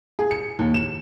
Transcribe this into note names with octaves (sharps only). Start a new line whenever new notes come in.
G#4
C#7
D#2
E7